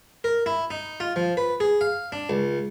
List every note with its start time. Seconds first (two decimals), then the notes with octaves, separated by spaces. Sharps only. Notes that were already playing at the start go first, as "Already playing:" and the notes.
0.24 A#4
0.46 E4
0.71 D#4
1.00 F4
1.16 F3
1.37 B4
1.60 G#4
1.81 F5
2.12 D4
2.30 C#2